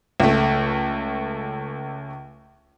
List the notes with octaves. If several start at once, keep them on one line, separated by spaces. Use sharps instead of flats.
C#2 A3